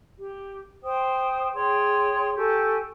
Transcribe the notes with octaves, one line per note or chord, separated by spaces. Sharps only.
G4
C5 G5 D#6
G#4 C#5 G5 C6
G4 A4 G#5 C#6